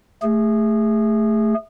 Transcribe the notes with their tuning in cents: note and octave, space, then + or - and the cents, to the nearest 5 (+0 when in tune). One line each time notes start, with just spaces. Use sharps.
A3 +0 G#4 -30